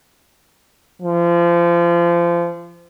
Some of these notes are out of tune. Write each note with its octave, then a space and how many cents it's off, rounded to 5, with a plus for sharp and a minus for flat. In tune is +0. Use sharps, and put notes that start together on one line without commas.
F3 -30